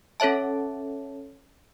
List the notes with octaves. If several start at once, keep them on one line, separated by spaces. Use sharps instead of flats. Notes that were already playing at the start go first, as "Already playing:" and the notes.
C#4 A4 C#5 E5 A5